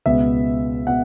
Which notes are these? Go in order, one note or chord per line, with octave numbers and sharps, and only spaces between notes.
C#2 B2 B3 E5
B2 F#5